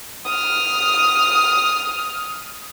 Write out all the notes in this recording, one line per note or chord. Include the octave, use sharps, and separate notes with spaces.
D#6 F6